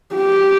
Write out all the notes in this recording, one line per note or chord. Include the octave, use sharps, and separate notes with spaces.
G4